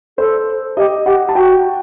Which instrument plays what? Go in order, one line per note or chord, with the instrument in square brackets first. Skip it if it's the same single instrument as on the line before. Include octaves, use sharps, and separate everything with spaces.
[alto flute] A4 [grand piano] C5
[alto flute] G4 [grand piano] D#5
[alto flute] G4 [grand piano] F#5
[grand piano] A5
[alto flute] F#4 [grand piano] G5